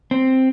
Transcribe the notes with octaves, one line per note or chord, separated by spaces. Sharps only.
C4